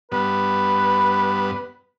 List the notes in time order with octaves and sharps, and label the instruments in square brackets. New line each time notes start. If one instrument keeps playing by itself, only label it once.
[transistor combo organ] G2 B3 [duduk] B4